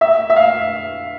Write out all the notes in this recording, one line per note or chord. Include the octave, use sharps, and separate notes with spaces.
E5
E5
F5